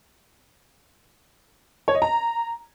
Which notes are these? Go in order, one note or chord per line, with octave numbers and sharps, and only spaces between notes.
C#5
D#5
A#5